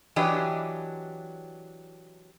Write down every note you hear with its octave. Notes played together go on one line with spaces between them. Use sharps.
E3 F#3 D4 G4 D#5